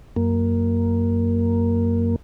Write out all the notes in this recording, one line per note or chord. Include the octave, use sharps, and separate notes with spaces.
F#2 A#3